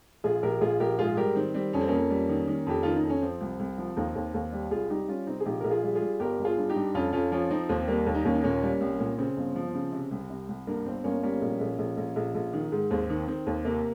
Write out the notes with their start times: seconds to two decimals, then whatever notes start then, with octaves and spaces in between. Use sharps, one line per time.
0.24 A#1 F4 G#4
0.43 A#1 G4 A#4
0.61 A#1 F4 G#4
0.80 A#1 G4 A#4
0.99 G#2 F4 G#4
1.17 G3 G4 A#4
1.36 D#3 C4
1.54 G3 C4
1.73 F2 C#4
1.81 C4
1.88 F2 A#3 C#4
2.10 G3
2.29 D#3
2.47 D#3
2.67 F2 G4
2.83 D#3 F4
2.96 D#4
3.03 F2
3.09 C#4
3.22 F3 C4
3.41 C2
3.59 C2
3.78 F3
3.97 D#2 C4 D#4
4.15 D#2
4.34 D#2
4.52 G3
4.71 C2 F4 G#4
4.90 G3 D#4 G4
5.08 G3 C#4 F4
5.27 C3 C4 D#4
5.40 G#4
5.45 A#1 D#4 G4
5.60 A#1 A#4
5.70 F4 G#4
5.83 G3
5.95 F4 G#4
6.02 G3
6.20 G1 G4 A#4
6.38 G1
6.44 F4 G#4
6.57 G2
6.70 D#4 G4
6.76 G2
6.94 F2 C#4 F4
7.13 F2 C#4 F4
7.32 F3 C#4 F4
7.50 F3 C4 D#4
7.69 D#2 C4
7.81 C4
7.87 G3 A#3
8.06 D#2
8.14 D#4
8.25 D#2 A#3 C#4
8.35 D#4
8.43 A#2 A#3 C#4
8.63 G3
8.81 C2
9.00 A#2
9.18 C#3 C4
9.37 G1
9.56 F3
9.74 C#3
9.92 C3
10.11 C2
10.30 C3
10.49 C2
10.67 G2 A#3
10.86 G1 C4
11.04 G1 A#3 C#4
11.23 G3 A#3 C#4
11.41 A#1
11.60 A#1
11.79 A#1
11.97 A#1
12.16 A#1
12.35 A#1
12.53 D#3
12.72 G#2
12.90 D#2 C4
13.10 D#3
13.28 D#3 C4
13.46 D#2
13.65 C3 A#3